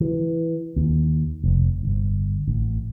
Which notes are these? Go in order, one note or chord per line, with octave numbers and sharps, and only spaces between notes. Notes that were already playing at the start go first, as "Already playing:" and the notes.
E3
D#2
F1
G1
A1